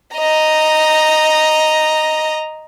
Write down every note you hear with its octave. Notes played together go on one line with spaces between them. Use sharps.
D#5 A#5